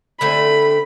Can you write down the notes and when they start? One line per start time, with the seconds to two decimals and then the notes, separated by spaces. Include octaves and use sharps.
0.21 D3 A3 C4 B5